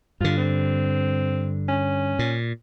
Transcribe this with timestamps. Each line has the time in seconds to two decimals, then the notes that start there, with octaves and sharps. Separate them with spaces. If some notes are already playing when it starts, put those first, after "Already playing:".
0.21 G2 D3 F4
0.38 C4
1.68 C#4
2.19 A#2